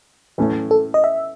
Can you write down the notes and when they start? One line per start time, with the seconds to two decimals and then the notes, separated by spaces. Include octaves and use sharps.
0.38 A2 E3 A3 C#4
0.71 A4
0.94 D#5
1.04 E5